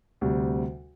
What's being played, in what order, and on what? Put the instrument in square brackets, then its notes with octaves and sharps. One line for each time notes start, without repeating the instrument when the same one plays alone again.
[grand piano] D2 C3 G3